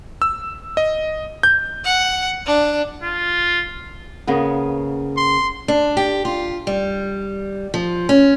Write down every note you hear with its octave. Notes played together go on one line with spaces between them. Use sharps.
E6
D#5
G6
F#5
D4
F4
C#3 A#3 B3
C6
D4
G4
F4
G3
F3
C#4